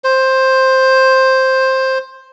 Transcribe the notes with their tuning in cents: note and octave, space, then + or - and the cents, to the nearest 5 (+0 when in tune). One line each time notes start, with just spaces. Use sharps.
C5 +5